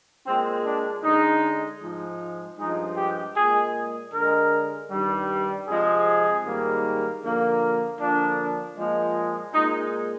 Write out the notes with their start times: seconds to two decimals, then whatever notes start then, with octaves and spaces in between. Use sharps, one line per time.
0.26 A#2 G#3 C4
0.65 D4
1.03 D3 G#3 D#4
1.81 G#2 F3 G#3
2.58 G2 F3 G#3 D#4
2.96 G4
3.35 A#2 G#3 G#4
4.12 D3 G#3 A#4
4.90 G2 D#3 G3
5.67 C3 F3 G#3 G#4
6.44 G#2 D#3 G3 A#3
7.22 D3 F3 A#3
7.99 D3 F3 A#3 D4
8.76 A#2 F3 G#3
9.53 A#2 G#3 D#4